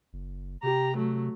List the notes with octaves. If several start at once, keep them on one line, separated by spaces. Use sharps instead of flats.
F#1
C3 G4 A#5
F#3 A3